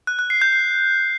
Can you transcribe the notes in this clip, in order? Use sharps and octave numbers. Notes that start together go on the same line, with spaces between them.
F#6
F#6
C7
G6
C7